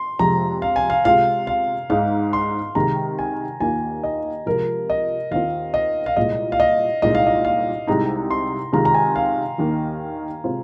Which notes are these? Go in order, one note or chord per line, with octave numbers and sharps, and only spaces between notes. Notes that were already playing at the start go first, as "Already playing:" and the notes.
Already playing: C6
F2 C3 F3 G#3 A#5
F5
G#5
F5
C3 G#3 F4 F5
F5
G#2 G#3 D#4 F5
C6
C3 D#3 G#3 A#5
G#5
D#2 D#3 A#3 F4 G#5
D#5
C3 F3 G#3 F4 A#4
D#5
D#2 D#3 C4 F4 F5
D#5
F5
C2 A#2 G#3 D#5
F5
D#5
C2 A#2 G#3 D#4 D#5
F5
D#5
F5
C2 C3 G#3 D#4 A#5
C6
C3 D#3 G#3 F4 A#5
A#5
G#5
F5
D#2 D#3 A#3 D#4
C3 G#3 C4 F4